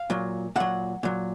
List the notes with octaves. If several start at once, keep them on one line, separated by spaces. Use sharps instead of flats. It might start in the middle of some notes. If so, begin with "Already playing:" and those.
Already playing: F5
A#2 F#3
A#2 F#3 F#5
A#2 F#3